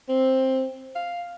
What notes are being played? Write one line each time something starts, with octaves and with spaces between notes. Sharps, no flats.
C4
F5